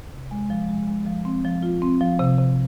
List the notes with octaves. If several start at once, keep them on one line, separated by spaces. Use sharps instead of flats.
C3
G#3
F3
G#3
G#3
F3
C4
F3
F4
C4
F3
C3
C3